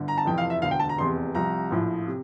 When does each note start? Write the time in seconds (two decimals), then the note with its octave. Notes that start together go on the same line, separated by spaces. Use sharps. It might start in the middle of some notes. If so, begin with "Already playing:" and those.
Already playing: G1 D3
0.08 A#5
0.18 A5
0.25 F1 F2 E3 G5
0.38 F5
0.50 E5
0.62 E1 D2 D3 F5
0.71 G5
0.80 A5
0.89 A#5
0.98 F1 E2 C3 C6
1.35 C2 C3 F3 A#5
1.71 A#1 A2 F3
2.07 C3